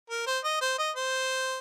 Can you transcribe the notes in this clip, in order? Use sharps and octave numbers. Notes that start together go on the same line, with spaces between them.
A#4
C5
D#5
C5
D#5
C5